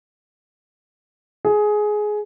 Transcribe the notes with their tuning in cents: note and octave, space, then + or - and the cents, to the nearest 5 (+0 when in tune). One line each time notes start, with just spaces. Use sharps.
G#4 +15